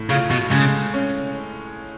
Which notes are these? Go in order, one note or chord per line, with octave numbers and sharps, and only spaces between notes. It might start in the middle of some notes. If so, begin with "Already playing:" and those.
Already playing: A2
C#3 F4
B2
C#3 G#3
C#4